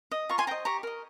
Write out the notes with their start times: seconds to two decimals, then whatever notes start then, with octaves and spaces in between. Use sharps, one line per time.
0.11 D#5
0.29 F4 A#5 C#6
0.38 G#5 C6
0.47 C5 G5 A#5
0.51 D#5
0.65 G4 A#5 C#6
0.83 A#4 D#5